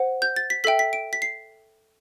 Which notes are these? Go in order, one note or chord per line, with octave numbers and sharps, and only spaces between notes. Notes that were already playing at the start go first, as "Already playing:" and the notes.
Already playing: C5 F#5
G6
A6
B6
A4 E5 G5 B6
B6
D7
B6
C7